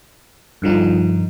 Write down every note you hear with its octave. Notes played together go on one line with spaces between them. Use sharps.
G2 D3 F3 D#4